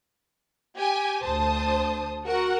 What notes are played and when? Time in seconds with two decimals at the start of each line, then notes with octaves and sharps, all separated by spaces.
0.77 G4 G#5
1.25 D2 C5 A5 D#6
2.25 F#4 A#4 F#5